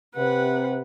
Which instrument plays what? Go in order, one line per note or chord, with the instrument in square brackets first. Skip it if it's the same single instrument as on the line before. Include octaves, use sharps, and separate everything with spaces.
[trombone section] C3 [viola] B4 F#5